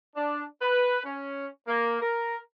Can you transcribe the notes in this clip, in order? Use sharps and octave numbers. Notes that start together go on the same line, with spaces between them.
D4
B4
C#4
A#3
A#4